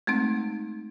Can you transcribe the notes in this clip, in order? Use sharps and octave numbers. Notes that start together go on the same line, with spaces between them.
G#3 A3 C4 D#4